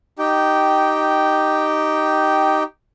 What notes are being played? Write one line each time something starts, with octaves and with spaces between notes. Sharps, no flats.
D#4 G4 G5